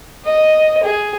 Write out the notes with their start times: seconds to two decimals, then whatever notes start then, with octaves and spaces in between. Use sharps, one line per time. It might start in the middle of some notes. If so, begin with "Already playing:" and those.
0.25 D#5
0.83 G#4